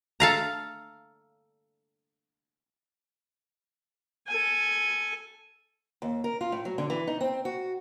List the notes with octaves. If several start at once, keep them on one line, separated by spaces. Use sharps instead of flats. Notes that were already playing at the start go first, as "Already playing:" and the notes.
A4 F5 A#5
A4 G#5
D#2
A#4
F4
A2
F#3
D3
E3
D#4
C4
F#4